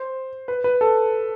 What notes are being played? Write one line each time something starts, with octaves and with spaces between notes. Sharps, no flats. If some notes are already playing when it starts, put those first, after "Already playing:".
Already playing: C5
B4
B4
A4